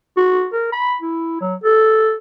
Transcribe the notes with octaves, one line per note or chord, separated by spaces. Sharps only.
F#4
A#4
B5
E4
F#3
A4